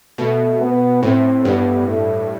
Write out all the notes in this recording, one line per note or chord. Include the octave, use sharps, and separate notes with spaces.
B2 A3
B3
A2 C4
G2 B3
A3